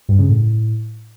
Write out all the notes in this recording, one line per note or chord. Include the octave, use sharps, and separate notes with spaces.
G2
C#3
A2